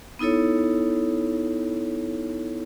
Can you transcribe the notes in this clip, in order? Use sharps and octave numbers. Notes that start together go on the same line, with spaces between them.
B3 D#4 E4 A4 C#5